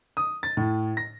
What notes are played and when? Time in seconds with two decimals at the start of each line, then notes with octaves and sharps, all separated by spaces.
0.17 D#6
0.43 A6
0.57 A2
0.97 A#6